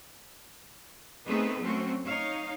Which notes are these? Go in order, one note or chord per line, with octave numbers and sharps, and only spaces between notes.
A3 B3 C4 D#4 G#4 B4
F#3 A3 C4 C#4 F#4
D#4 C#5 F5